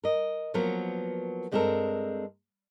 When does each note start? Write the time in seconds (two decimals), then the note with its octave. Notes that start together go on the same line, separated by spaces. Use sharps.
0.04 A#4 D#5
0.54 F3 F#3 A#3 B3 A#4
1.51 G2 G#3 C4 G4 A4 A#4